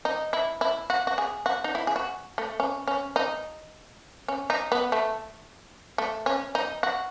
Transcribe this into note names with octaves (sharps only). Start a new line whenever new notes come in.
D#4
E4
E4
F#4
F#4
G#4
F#4
D#4
E4
G#4
F#4
A3
C#4
C#4
D#4
C#4
D#4
B3
A3
A3
C#4
D#4
F#4